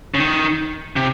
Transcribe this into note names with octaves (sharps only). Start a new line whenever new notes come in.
C#3
D#3
C3